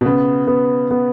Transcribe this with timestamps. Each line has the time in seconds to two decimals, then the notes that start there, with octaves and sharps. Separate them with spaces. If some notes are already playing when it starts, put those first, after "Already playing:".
0.01 B2
0.06 C#3 B3
0.47 B3
0.91 B3